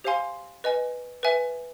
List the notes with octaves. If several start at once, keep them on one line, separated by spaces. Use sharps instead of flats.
G4 C5 F5 G#5 C6
B4 D#5 G#5
B4 E5 G#5